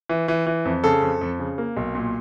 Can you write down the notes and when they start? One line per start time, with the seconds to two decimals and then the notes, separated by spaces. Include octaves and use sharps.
0.09 E3
0.28 E3
0.47 E3
0.65 F2
0.84 C#3 A4
1.02 F2
1.21 F2
1.39 C#3
1.58 A#3
1.77 B1
1.95 A#2